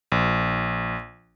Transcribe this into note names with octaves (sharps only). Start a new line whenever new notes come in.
A#1